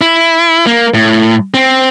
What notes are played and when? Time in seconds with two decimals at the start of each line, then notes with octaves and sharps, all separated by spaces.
0.01 E4
0.67 A#3
0.94 A2
1.54 C4